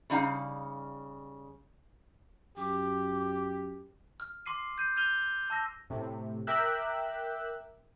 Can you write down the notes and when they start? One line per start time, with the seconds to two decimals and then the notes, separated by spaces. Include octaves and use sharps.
0.10 C#3 G3 D#4 F5
2.57 F#2 G4 D6
4.20 F6
4.46 C6 D6 C7 D#7
4.78 G6 C7 D#7
4.96 F6 G6 G#6 D#7 F7 G7
5.50 A5 E6 A#6
5.90 A2 C3
6.47 A#4 E5 G5 D6 E6 F#6